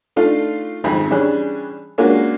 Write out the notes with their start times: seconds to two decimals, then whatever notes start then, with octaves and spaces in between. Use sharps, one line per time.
0.16 A3 D4 D#4 F4 A4
0.84 G#1 F2 G#3 D#4 G#4 B5
1.10 E3 G3 C#4 D4 G#4 F#6
1.98 G#3 A#3 C#4 D4 F4 F#4